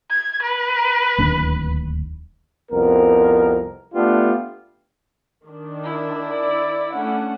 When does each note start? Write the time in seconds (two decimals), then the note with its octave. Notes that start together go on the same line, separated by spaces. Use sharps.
0.11 G#6
0.42 B4
1.18 D1 D#2 D4
2.71 C2 F2 B3 A#4
3.95 A3 B3 D4 F4 G4
5.46 D#3 D4
5.84 E4
6.32 D5
6.93 A3 C#4 D4 F#5